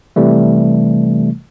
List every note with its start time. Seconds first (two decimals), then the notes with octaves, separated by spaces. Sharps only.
0.16 C3 E3 G3 A3